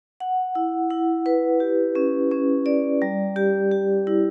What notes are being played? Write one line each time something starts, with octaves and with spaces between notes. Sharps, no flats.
F#5
E4
E4
B4
G4
C#4
C#4
D5
G3
G4
G4
E4